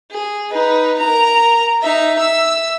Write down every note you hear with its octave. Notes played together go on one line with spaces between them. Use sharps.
G#4
D#4 B4
A#4 A#5
D#4 E5
E5 E6